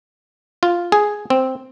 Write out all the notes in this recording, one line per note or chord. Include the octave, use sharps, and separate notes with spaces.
F4
G#4
C4